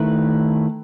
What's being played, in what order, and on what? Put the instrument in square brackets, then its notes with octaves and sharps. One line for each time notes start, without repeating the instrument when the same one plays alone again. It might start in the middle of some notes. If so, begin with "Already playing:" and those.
Already playing: [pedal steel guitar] D#3 A3 E4 B4